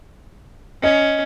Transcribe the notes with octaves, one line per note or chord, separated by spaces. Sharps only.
C#4 D#5